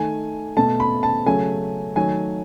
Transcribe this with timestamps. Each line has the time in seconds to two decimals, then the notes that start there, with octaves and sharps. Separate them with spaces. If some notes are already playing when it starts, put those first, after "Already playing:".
Already playing: D#3 A3 G#5
0.57 B2 A3 A5
0.80 B5
1.03 A5
1.26 C#3 F#3 A3 G#5
1.96 D#3 F#3 A3 G#5